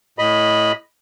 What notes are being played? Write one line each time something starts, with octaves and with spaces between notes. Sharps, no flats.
A2 D#5 B5